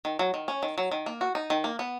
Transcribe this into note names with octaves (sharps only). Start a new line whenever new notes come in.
D#3
F#3
D#3
C#4
D#3
F#3
D#3
A#3
F#4
D#4
D#3
A#3
B3